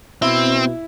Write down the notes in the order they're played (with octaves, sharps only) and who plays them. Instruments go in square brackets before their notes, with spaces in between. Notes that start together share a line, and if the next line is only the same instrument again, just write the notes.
[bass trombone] B2 [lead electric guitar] C4 [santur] E4